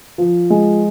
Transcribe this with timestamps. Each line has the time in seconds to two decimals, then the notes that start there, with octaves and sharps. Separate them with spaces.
0.18 F3
0.50 G#3